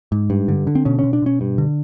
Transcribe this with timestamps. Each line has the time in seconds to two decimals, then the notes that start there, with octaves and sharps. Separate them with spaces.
0.12 G#2
0.30 G2
0.48 D3
0.67 D3
0.75 C4
0.85 B2 C#4
0.99 B2 C#4
1.13 D4
1.22 B2 C#4
1.41 G2
1.58 D3